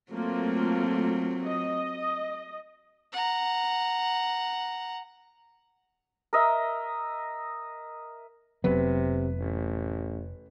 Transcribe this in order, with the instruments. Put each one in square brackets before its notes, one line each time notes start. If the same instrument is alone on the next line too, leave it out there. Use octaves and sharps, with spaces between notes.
[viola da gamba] F#3 C4 [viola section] A3 A#3 F4
[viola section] D#5
[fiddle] F#5 A#5
[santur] A#4 D#5 E5
[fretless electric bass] F1 F#3 B3 [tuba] C3 [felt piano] B4
[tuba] A1